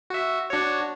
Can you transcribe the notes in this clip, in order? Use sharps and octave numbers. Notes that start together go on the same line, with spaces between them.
F#4 E5
D4 F#4 C#5